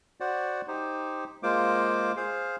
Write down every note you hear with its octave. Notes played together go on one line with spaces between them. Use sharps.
F#4 C5 D5 F#5
D#4 G4 C5
G#3 A#3 F4 C5 D6
G#4 C5 F5